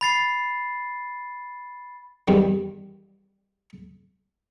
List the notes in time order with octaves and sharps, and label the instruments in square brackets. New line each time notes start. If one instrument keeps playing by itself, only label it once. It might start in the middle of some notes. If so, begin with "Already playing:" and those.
[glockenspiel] B5 A6 C7
[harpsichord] E2 G2 D#3 G3